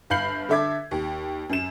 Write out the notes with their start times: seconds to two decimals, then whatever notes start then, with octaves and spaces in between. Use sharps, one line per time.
0.10 G1 F5 B5 G6 C7 F#7
0.49 D3 A4 E5 D6 G#6
0.91 D#2
1.49 F#2 E7